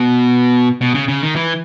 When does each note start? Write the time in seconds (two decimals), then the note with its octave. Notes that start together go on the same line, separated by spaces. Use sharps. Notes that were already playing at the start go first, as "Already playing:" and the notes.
Already playing: B2
0.81 B2
0.95 C#3
1.08 C#3
1.23 D#3
1.36 E3